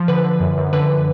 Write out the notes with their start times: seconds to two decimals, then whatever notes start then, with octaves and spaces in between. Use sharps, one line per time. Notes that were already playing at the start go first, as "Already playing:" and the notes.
Already playing: F3
0.08 D3 B4
0.24 D3
0.40 F#2
0.58 F#2
0.73 D3 B4